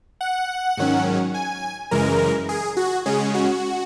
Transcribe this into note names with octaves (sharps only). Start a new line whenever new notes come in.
F#5
G#2 D#3 F#3 C#4
G#5
F#2 C#3 E3 G#3 A#4
G#4
F#4
C#3 G#3 C#4 G#4
F#4